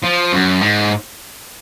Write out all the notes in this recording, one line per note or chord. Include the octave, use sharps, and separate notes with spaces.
F3
F#2
G#2